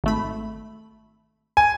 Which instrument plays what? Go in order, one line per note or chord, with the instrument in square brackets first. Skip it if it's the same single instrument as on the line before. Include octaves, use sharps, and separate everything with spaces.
[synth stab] G#1 A3 B5
[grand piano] G#5